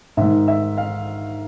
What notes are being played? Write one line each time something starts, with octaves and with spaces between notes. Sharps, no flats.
G#2 D#3 E5
E5
F5